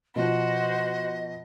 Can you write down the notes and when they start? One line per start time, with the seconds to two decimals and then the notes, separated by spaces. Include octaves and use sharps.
0.16 B2 F3 F#4 C5 D#5